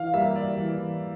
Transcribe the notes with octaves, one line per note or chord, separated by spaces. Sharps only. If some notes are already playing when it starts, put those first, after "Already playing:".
Already playing: E3 F5
G3 A#3 E5
D5
E3